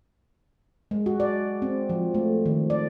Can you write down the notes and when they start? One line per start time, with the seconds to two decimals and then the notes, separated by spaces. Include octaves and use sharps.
0.91 G#3
1.06 F#4
1.20 D5
1.62 C4
1.90 F3
2.15 A3
2.46 D#3
2.70 D5